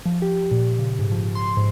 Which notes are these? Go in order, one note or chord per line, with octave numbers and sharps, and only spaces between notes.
F3
G4
A#2
C#3
G#2
F3
C6
G#2